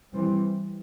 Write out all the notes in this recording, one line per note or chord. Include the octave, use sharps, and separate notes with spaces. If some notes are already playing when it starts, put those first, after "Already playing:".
E3 G3 C4